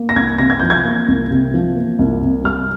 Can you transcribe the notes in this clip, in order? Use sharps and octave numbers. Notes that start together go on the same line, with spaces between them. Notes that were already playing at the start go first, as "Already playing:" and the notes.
Already playing: A#3
A#6
C2 G#6
C3 A#6
G#6
F3 G6
G#6
A#3
C2
C3
F3
A#3
C2
C3
G3 F6